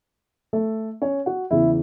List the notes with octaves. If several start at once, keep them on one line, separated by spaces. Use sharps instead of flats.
A3 A4
C#4 C#5
F#4 F#5
E2 C#3 E3 E4 E5